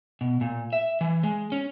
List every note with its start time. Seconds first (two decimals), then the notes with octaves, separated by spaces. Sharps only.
0.21 B2
0.41 A#2
0.73 E5
1.01 E3
1.23 G#3
1.52 C#4